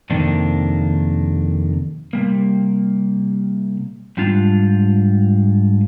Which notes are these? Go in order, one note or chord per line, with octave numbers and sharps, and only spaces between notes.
F2 C3 D#3 A#3 D4
C3 G3 A#3
G#2 G3 D4 F4